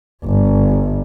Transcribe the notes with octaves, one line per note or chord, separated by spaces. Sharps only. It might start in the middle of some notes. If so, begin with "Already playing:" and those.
G1